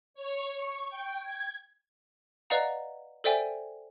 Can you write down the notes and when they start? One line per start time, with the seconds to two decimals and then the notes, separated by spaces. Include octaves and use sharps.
0.14 C#5
0.50 C#6
0.90 G5
1.22 G#6
2.50 B4 D5 D#5 F5 F#5 A#5
3.24 A4 C5 D5 E5 G5 G#5